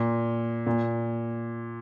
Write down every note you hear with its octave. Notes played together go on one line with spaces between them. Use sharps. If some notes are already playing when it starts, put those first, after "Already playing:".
Already playing: A#2
A#2